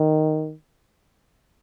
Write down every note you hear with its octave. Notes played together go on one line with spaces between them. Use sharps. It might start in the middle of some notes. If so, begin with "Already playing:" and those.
Already playing: D#3